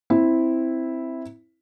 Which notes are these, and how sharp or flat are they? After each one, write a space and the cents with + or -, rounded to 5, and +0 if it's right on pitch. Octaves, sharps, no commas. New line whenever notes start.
C4 +0 E4 -5